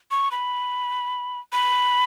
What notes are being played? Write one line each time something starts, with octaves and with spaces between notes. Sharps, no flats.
C#6
B5
B5